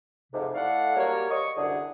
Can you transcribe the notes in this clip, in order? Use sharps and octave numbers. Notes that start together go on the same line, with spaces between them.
F2 G#2 C3
A3 E4 A4 D5 F5 F#5
F#3 G3 A#3 A#4 C#5
D#5 C#6
C2 F#2 D3 D4 G#4